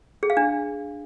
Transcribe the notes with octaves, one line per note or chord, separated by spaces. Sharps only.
G#4
F5
D4